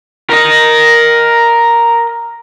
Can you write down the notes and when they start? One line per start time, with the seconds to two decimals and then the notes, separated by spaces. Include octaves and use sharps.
0.30 A#4 D#5